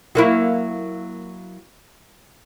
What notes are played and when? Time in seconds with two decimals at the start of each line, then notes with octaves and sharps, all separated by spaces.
0.15 F#3 A#3 E4